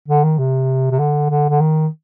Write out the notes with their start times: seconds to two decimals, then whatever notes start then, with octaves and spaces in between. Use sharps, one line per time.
0.08 D3
0.24 D#3
0.38 C3
0.91 C3
0.99 D3
1.30 D3
1.50 D3
1.60 D#3